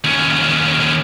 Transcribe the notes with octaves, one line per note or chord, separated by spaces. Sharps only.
D#2 C#4